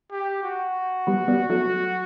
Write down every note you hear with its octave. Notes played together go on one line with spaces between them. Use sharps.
G4
F#4
G3 B3
G3 B3
F#3 A3